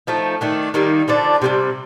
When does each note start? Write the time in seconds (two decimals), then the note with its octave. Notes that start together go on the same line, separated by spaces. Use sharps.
0.07 F3 A3 D#4
0.41 D#3 A3 D4
0.74 D#3 G3 A#3 D#4
1.08 D3 F3 A3 D4
1.42 C3 D#3 G3